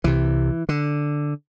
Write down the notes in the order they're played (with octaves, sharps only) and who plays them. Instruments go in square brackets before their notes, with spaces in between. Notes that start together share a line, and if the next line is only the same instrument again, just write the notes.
[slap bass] C2 C3 E3
D3